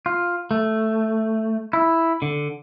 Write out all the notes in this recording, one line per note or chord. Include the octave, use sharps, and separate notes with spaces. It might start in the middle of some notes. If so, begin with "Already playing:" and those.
F4
A3
E4
D3